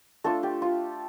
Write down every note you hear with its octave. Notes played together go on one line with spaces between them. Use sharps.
A3 D4 F4 A4
G4
F4